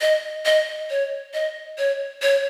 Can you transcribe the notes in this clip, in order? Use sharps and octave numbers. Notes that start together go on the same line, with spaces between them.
D#5
D#5
C#5
D#5
C#5
C#5